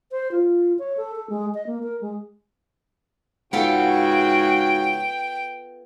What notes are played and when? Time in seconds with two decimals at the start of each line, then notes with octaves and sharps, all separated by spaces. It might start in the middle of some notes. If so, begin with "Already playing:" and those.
0.11 C5
0.31 F4
0.79 C#5
0.97 A4
1.16 A4
1.30 G#3
1.54 D#5
1.67 A#3
1.83 A#4
2.01 G#3
3.53 G#2 C#3 B3 F4 F#4 A4 G5